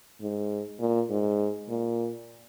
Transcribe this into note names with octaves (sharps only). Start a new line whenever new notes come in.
G#2
A#2
G#2
A#2